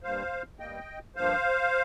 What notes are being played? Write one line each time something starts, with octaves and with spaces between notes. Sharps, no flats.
G2 G3 A#3 C5 F5
G2 G3 A#3 D#5 G5
G2 F3 A#3 C5 F5